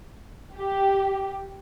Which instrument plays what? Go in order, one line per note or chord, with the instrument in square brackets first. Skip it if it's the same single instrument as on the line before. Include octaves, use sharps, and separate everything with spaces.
[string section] G4